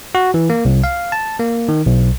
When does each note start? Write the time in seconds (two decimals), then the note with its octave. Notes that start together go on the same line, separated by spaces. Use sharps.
0.15 F#4
0.34 E3
0.50 A#3
0.65 C2
0.84 F5
1.12 A5
1.39 A#3
1.69 D#3
1.86 B1